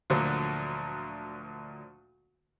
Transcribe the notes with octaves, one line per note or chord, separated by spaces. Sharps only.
D2 A#2 D3 F3 F#3 A#3